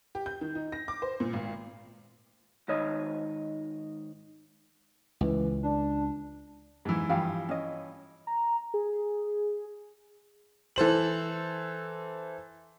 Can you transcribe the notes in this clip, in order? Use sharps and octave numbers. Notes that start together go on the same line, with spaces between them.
G4
G6
D#3
D#4
A#6
D6
C5
A#2
G#1
G#2 D#3 C#5 D#5
C#2 E3
D4
G#2 E3
G2 E3 F3 G4 F5
C#4 D#5
A#5
G#4
E3 A4 C5 F#7